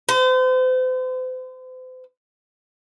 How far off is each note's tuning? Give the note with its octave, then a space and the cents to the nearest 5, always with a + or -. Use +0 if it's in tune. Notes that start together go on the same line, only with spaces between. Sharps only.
C5 -40